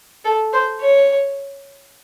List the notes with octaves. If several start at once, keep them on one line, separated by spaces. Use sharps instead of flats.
A4
C5
C#5